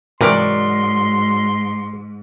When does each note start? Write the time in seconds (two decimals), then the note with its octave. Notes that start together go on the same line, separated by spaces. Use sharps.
0.21 G#2 C3 E3 F#3 A#4 D5 C6